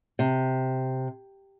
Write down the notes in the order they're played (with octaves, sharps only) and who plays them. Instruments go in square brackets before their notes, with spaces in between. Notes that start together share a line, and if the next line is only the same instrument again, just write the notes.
[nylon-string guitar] C3